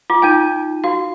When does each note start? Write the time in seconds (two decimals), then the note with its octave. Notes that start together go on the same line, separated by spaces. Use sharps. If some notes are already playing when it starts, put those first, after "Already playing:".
0.10 F4 D6
0.22 D#4 F4 G5 G6 D#7
0.84 F#4 F5